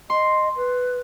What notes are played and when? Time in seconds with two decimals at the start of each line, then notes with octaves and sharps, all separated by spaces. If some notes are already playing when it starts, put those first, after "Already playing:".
0.10 D#5 C6
0.56 B4